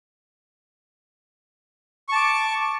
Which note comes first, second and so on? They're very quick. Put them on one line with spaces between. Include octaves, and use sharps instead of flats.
C#6 A5 D6